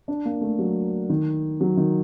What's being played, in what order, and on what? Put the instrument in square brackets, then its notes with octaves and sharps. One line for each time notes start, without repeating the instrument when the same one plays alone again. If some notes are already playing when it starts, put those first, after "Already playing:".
[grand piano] D4
A#3
A3
F#3
D#3
F#3
D#3